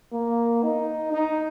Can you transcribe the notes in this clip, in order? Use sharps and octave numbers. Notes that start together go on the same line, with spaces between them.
A#3
D#4
D#4